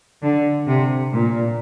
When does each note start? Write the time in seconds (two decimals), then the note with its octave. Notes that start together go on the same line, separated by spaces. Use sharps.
0.23 D3
0.68 C3
1.12 A#2